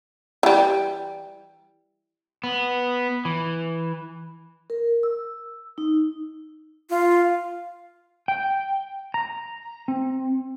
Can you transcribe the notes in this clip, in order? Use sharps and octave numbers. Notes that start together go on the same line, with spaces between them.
E3 G3
B3
E3
A#4
E6
D#4
F4
G5
A#5
C4